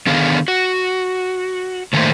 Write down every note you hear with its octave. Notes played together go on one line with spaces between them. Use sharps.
D3 D#3 B3 G#4 A4 F5
F#4
A2 D3 D#3 A3 A#3 C5